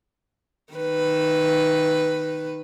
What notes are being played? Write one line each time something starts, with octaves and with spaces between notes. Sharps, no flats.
D#3 B4